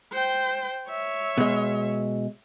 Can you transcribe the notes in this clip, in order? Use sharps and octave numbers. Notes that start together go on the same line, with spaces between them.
C5 G5
C#5 E5
B2 G#3